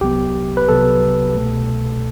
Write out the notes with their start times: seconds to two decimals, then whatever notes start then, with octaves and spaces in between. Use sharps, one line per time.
0.01 C2 C3 F#3 B3 G4
0.57 B4
0.68 C2 C3 F#3 B3 A4
1.35 C2 B2 A3